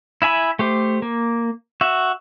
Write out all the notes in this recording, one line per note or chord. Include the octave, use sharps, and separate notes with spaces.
E4 E5 G#5 B5
A3 G4 C5
A#3
F#4 E5